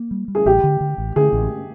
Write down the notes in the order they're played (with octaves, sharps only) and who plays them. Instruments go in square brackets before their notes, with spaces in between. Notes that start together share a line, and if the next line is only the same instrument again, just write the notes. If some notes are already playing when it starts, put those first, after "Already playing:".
Already playing: [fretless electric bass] A#3
G3
G3
[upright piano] G#4
[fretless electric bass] A1 [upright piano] G4
[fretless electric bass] D3
D3
A1
[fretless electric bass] D3 [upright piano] G#4
[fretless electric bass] A1